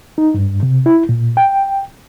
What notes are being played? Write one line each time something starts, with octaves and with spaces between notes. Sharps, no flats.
D#4
G2
C3
E4
A#2
G5